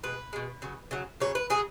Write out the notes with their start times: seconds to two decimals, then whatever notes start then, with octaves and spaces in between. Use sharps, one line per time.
0.03 B2 G#3 B4
0.33 B2 G#3
0.62 C#3 F#3
0.91 C#3 F#3
1.20 C#3 F#3 C#5
1.35 B4
1.50 C#3 F#3 G#4